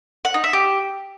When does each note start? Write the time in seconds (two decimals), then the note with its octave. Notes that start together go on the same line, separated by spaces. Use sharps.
0.25 F#5
0.34 D#4
0.44 E5
0.53 G4